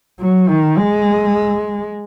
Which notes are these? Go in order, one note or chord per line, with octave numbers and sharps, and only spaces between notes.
F#3
D#3
G#3